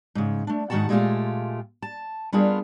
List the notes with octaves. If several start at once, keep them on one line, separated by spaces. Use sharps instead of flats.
G#2 C#3
A3 D4
G#2 D#3 C4 F#4 F#5 A5
A#2 G#3 A3 D#4 F4 G4
A5
G3 B3 D4 F4 G#4 A#4